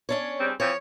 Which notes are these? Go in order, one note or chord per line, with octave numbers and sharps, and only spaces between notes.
C#4 D4 C#5
C#3 G3 C4
E3 F3 C4 C#5